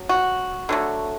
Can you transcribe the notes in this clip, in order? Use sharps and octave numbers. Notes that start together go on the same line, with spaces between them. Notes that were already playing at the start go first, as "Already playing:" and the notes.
Already playing: F#3
F#4
D3 F#3 A3